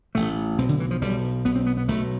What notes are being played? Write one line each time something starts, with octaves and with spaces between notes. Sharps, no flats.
A1 A2 A3
B1 B2 C4
D3
E3
F3
B1 B2 G3
B1 B2 B3
C4
B3
B3
B1 B2 A3